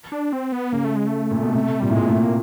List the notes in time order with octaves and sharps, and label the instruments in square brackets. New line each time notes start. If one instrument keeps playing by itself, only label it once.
[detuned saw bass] D4
C4
B3
[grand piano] C#3 [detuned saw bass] A#3
[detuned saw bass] A3
G#3
A3
[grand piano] A#2
B2
C3
[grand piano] A#2 [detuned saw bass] G3
[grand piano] A2
[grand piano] A#2 [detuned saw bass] G#3
[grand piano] A2 [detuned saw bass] A3
[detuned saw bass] A#3